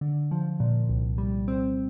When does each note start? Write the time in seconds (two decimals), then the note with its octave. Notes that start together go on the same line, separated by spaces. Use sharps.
0.01 D3
0.31 F3
0.60 A#2
0.89 C2
1.18 G3
1.48 C4